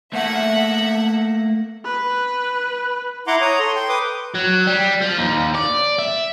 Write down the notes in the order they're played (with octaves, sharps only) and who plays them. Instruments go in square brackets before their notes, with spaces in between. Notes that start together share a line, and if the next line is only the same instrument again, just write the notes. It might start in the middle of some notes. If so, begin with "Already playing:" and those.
[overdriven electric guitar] A3 A#3 [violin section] E5 F#5
[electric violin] B4
[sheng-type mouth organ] E4 F#5 A#5 C6 D6
C#5 A#5 D#6
A4 C6
G5 C6
B4 D6 D#6
[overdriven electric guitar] F#3
G3
F3
D#2
D5
E5